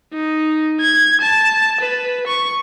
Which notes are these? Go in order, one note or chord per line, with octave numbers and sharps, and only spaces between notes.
D#4
G#6
A5
B4
C#6